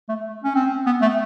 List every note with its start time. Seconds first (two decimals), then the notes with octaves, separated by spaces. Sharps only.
0.09 A3
0.44 C#4
0.55 C4
0.86 B3
1.02 A3